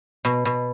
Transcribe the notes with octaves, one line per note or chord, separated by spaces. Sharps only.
B2
B2